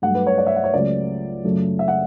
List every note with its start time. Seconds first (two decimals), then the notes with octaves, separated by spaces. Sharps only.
0.02 G2 F#3 A3 F#5
0.14 B4
0.27 C#5
0.38 D5
0.46 E5
0.56 F#5
0.64 C#5
0.73 C#2 C#3 F#3 A3 D5
1.44 F#2 C#3 F#3 A3
1.79 E5
1.88 F#5